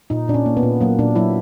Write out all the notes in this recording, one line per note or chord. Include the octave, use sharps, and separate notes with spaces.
A#2 D#4
A#2 D4
C#4
A#3
B3
A#2
F#3 A#3
A#2 D4
F#3 E4